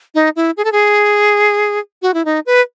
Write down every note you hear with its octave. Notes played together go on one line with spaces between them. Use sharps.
D#4
E4
G#4
A4
G#4
F#4
E4
D#4
B4